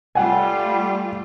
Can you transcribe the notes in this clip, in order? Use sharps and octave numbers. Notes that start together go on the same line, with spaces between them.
G3 A3 F4 F#5 G#5